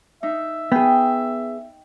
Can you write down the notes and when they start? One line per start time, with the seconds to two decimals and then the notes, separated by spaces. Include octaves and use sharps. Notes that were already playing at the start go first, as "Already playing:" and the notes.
0.23 D#4 E5
0.72 B3 G#4 G5